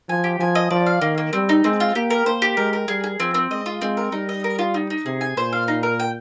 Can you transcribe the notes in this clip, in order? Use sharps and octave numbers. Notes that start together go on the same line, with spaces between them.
F3 G#5
G4
F3 G#5
D#5
F3 D5
F5
D#3 A#3
A#3
G3 C4
D#4
G#3 C4
F4
A#3 G4
A#4
A#3 C5
G4
G#3 A#4
A#4
G3 G#4
G#4
F3 C4
C4
G#3 D#5
F4
G#3 C4
A#4
G3 D#4
D#5
A#4
F4
D#4
D#4
C3 G#4
G#5
A#2 C5
F5
D#4
A#4
G5